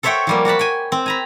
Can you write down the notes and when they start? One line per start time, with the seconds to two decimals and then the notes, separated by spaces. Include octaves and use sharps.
0.03 A4 C5 C#5 E5 F#5 G5
0.27 F3 G3 A#3
0.45 F#4 F#5 A5 B5
0.59 G5 G#5
0.92 C4
1.06 G#5 A#5 B5